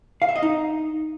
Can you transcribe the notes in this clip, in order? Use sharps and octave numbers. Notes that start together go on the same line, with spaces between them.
F5
E5
D#5
D#4